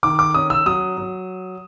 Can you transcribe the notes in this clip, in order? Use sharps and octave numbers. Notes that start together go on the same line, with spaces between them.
D#3 D6
D6
C#4 D#6
E6
F#3 D#6
F#3